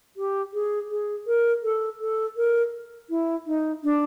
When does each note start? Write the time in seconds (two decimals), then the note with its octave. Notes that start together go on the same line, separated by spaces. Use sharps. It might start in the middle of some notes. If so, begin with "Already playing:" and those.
0.17 G4
0.54 G#4
0.90 G#4
1.27 A#4
1.63 A4
2.00 A4
2.37 A#4
3.10 E4
3.47 D#4
3.84 D4